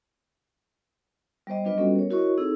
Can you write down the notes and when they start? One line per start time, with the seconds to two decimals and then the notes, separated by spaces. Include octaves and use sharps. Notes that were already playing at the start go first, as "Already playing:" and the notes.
1.47 G3 B3 C5 D#5
1.65 F#3 B3 D4 F4 B4 D#5
1.78 G3 B3 C#4 F#4 A4
1.96 A#4 C#5
2.10 E4 F#4 A#4 C#5 D#5 C#6
2.38 C4 D#4 G#4 A4 E6